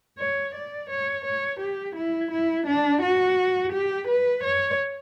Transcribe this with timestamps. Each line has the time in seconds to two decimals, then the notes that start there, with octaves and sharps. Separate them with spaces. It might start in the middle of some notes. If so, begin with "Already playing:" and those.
0.19 C#5
0.54 D5
0.90 C#5
1.25 C#5
1.60 G4
1.96 E4
2.31 E4
2.67 D4
3.02 F#4
3.72 G4
4.08 B4
4.43 C#5